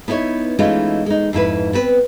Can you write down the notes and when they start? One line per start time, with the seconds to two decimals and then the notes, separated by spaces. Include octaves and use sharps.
0.08 B3 D#4 E4 B4 C#5
0.59 E3 G#3 A3 C#4 D#4 F4
1.06 G#3 D#4
1.33 F2 G#2 E4 B4
1.73 B3 C4 B4